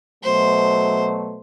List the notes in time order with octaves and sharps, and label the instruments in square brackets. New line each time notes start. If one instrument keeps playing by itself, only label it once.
[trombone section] B2 F#3 A3 [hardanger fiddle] C5